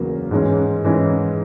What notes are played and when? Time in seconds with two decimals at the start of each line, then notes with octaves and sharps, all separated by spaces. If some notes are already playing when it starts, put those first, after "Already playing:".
Already playing: E2 C#3 F#3 A#3
0.31 G#2 E3 G#3 C#4
0.84 G#2 E3 G#3 C#4